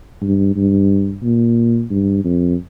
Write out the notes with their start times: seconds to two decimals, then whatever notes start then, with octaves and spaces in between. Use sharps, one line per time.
0.22 G2
0.56 G2
1.23 A#2
1.90 G2
2.24 F2